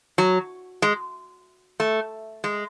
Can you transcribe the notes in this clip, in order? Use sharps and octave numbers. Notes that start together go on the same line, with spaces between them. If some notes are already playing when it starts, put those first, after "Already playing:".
F#3
G#3
A3
G#3